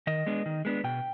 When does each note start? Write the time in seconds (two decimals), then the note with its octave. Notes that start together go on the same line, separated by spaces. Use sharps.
0.07 D#3 D#5
0.26 G#3 B3 D4
0.46 D#3
0.65 G#3 B3 D4
0.84 B2 G5